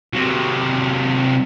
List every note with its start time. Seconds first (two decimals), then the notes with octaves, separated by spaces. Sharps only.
0.14 C3 F#3